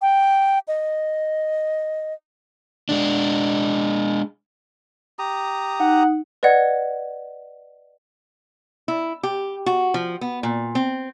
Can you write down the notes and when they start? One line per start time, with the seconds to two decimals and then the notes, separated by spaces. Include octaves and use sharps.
0.02 G5
0.68 D#5
2.89 G#3 D4
5.19 G4 A#5 D#6
5.80 D#4 F#5
6.43 B4 D5 D#5 F#5 G#6
8.88 E4
9.23 G4
9.66 F#4
9.94 F3
10.21 B3
10.43 A#2
10.75 C4